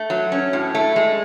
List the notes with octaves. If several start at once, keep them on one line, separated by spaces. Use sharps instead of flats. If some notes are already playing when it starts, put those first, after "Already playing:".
Already playing: A3
F#3
C#4
A2
A3
G#3